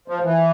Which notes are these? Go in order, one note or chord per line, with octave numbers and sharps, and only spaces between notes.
F3
E3